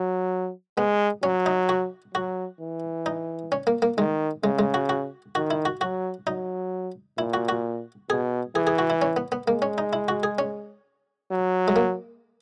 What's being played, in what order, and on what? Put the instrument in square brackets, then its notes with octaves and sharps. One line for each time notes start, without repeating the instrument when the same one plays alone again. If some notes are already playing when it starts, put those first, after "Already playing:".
Already playing: [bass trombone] F#3
[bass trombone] G#3 [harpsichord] B3
[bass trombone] F#3 [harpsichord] C#4
[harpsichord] D#4
F#4
[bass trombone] F#3 [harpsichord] F#4
[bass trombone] E3
[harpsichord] D#4
C#4
A#3
A#3
[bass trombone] D#3 [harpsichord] G#3
[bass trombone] C#3 [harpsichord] G#3
[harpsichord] G#3
F#4
F#4
[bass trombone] D#3 [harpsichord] F#4
[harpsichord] E4
F#4
[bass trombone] F#3 [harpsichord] F#4
[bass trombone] F#3 [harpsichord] D#4
[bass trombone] A#2 [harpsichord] E4
[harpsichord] F#4
F#4
[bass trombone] B2 [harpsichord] G#4
[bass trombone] E3 [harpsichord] G#4
[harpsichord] G#4
F#4
E4
C#4
B3
B3
[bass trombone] G#3 [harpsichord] A#3
[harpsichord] C#4
D#4
E4
F#4
G#4
C#4
[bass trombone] F#3
[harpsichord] G#3
A#3